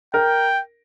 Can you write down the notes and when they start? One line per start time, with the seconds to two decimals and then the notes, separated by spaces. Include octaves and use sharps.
0.14 A#4 G5